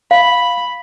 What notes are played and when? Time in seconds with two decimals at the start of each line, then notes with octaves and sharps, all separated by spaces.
0.11 F5 B5